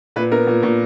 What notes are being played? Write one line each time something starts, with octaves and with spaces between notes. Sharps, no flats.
A#2 B4
B3 A#4
A#2
A#2